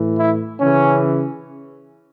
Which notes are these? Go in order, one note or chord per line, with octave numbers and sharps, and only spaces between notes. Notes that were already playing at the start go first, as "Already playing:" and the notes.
Already playing: A2 E3
E4
C#3 E3 C#4